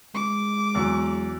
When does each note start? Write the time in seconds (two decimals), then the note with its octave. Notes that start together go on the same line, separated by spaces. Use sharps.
0.15 G#3 D6
0.75 E2 F#3